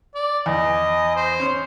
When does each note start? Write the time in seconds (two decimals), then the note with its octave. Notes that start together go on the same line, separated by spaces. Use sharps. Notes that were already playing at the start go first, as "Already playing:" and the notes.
0.15 D5
0.46 E2 D#5
1.16 C5
1.40 C#4